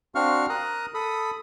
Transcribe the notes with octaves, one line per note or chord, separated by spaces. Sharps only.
C4 D4 F#4 F5 C#6 F6
A#4 A#5 D#6 F#6
A4 B5 D#6